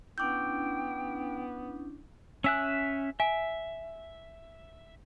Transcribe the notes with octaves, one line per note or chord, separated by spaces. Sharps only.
B3 C#4 D4 E4 G5 D6 G6
C#4 E5 G#5 E6 F#6
E5 G#5